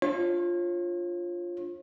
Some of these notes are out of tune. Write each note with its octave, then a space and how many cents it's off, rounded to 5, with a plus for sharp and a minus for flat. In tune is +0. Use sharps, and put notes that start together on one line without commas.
D4 +0 F4 +0 C#5 -40